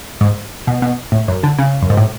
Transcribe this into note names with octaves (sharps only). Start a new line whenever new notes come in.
G#2
B2
B2
A2
F#2
D3
C#3
F#2
G#2
A2